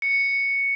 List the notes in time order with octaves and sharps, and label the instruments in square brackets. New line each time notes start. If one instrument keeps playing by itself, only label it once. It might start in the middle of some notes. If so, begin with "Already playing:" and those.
[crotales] C#7